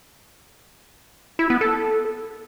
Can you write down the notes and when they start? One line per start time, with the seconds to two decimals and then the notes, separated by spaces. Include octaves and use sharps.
1.39 E4
1.50 B3
1.61 A4